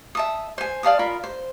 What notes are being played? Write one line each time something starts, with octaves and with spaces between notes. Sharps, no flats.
E5 A5 D#6
C5 G#5
D5 F5 A5 D#6
F4 A#4 B5
C5